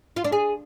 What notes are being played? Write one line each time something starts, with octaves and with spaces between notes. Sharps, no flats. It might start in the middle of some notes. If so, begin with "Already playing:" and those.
F4
D4
G#4